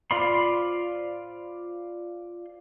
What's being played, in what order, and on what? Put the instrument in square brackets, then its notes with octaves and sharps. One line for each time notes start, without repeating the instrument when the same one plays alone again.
[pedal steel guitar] F4 C5 D5 B5 C6